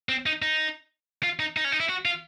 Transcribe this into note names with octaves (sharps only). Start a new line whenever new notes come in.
C4
D#4
D#4
F4
D#4
D#4
C#4
D#4
E4
F#4
F4